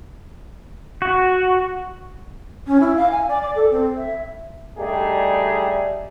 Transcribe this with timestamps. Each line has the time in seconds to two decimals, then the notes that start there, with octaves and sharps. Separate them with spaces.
1.02 F#4
2.66 C#4
2.80 E4
2.96 F5
3.11 G#5
3.28 D5
3.42 D5
3.55 A4
3.71 C4
3.96 E5
4.79 G3 A3 D4 D#4 G4 G#4